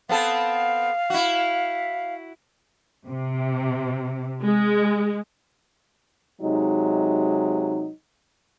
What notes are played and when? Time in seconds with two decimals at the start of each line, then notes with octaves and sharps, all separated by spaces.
0.09 B3 C4 A4 F5
1.10 E4 F#4
3.06 C3
4.44 G#3
6.42 C3 F#3 G#3 D#4